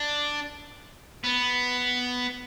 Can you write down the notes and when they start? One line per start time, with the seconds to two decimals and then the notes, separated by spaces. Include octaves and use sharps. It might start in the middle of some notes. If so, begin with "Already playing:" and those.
Already playing: D4
1.24 B3